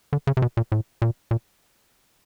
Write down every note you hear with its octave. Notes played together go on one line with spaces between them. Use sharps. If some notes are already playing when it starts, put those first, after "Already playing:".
D3
C#3
C3
B2
A#2
A2
A#2
A#2